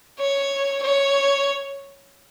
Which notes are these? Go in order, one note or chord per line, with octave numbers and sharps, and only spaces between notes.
C#5
C#5